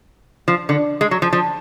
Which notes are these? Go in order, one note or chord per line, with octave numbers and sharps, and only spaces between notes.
F3
D3
G#3
F#3
F3
F3